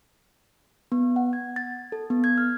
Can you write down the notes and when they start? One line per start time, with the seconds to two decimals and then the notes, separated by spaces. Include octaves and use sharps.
0.92 B3
1.16 F#5
1.33 G#6
1.56 A6
1.92 A4
2.10 B3
2.24 G#6
2.38 F6